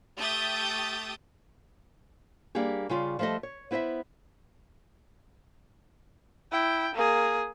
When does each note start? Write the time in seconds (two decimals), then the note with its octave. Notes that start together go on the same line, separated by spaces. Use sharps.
0.17 A3 G4 E5 D#6 G6 A6
2.55 G3 A#3 D4 G4 G#4
2.89 C#3 G3 E4 F4 G#4 D5
3.19 F3 G3 A3 A4 D#5
3.43 C#5
3.71 B3 E4 C5 D#5 E5
6.52 E4 G5
6.95 A#3 G#4